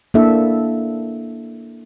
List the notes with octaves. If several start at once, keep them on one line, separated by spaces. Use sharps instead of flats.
A#3 D4 E4 A4 E5